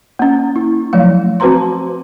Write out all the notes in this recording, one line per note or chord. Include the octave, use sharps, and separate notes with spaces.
A#3 C#4
E4
F3 F#3 A3 F5
C4 F#4 B4 C5 A#5 C6